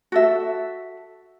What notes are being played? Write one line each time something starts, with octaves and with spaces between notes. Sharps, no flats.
F#4 A4 E5